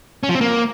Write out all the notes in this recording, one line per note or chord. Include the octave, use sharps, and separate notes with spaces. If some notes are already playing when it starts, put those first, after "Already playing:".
C#4
F3
C4
A#3